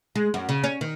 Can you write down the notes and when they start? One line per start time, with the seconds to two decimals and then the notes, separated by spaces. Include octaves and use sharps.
0.16 G#3
0.34 F#2
0.49 C#3
0.64 C#4
0.81 D#3